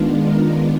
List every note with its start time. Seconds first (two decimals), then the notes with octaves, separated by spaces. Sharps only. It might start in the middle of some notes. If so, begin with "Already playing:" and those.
Already playing: D#3 G#3 B3 D4 F4
0.22 A#4